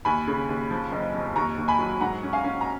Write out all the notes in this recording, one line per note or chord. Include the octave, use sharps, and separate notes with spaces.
D#2 G#5 B5
C#3
D#2
F3
F#1
F2
D#2 A#5 C#6
D#2
G#5 B5
F#3
G#2 F#5 A#5
C#4
F5 G#5
C#4
A#5